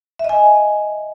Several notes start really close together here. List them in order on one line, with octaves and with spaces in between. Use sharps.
E5 D#5 G#5